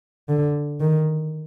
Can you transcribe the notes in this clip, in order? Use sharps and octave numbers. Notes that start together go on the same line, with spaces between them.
D3
D#3